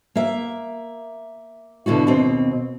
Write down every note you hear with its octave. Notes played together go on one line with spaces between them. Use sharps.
A#3 E5
B2 D3 E4 F#4
D#2 B2 C4